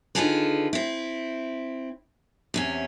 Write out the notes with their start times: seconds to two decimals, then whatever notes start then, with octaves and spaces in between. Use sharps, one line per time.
0.15 D3 D#3 F4 G#4 A4 B4
0.73 C4 E4
2.54 E2 C3 C#4